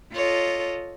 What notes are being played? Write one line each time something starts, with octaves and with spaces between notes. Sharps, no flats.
F4 A4 C#5 D#5